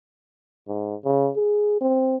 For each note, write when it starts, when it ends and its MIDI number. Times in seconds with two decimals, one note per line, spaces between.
0.68 0.95 44
1.05 1.30 49
1.36 1.80 68
1.81 2.17 60